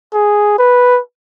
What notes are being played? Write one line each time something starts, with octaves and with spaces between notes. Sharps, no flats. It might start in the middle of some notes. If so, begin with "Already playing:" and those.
G#4
B4